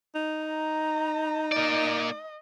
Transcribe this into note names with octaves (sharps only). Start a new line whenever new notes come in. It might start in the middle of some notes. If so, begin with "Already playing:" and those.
D#4
A#5
A#3 D5 D#5